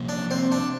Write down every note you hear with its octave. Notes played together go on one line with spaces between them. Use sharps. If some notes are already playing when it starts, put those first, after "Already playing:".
Already playing: C3 F3 A#3
D4
C4
D4